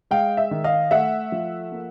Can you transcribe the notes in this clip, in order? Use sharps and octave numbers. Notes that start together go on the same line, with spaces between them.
G#3 F5 G5
E5
D#3
D#5 F5
A3 E5 F#5
F3
A#3